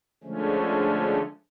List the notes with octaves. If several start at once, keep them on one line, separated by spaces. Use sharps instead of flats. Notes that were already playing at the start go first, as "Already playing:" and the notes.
D3 F3 G#3 A3 C#4